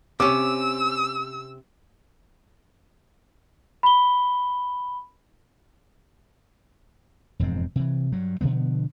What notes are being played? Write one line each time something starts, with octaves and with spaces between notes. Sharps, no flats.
C3 C#4 D6 E6
B5 G7
E1 F2 G#2 C4
C3 E3
G2 F#3
B2 D3 F3 B3